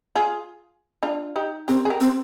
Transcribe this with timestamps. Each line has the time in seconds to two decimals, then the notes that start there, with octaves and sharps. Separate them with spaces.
0.15 F4 G#4
1.03 D4 F4
1.36 D#4 G4
1.68 C4 G4 A#4
1.85 G#4
1.90 G4 A#4
2.01 C4